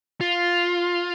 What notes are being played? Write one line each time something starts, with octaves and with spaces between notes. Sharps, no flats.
F4